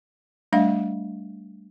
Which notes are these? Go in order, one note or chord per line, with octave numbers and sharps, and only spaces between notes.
G3 A3 D4 E5 F5